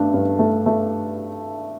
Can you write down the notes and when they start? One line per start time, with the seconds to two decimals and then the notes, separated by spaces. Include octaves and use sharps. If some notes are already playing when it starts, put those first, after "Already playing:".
Already playing: G2 A3 D4
0.14 G2
0.39 A3
0.66 A3